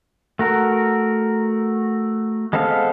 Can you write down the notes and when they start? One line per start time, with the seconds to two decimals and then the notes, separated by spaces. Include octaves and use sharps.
0.39 A3 F#4 A#4
2.53 G#3 B3 C4 A4 F5